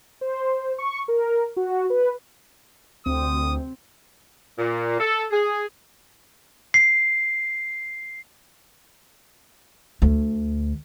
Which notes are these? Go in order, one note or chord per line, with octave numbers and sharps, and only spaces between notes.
C5
C#6
A#4
F#4
B4
D2 C4 D#6
A#2
A4
G#4
C7
D2